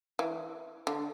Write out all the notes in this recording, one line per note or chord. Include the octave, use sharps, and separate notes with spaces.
E3
D3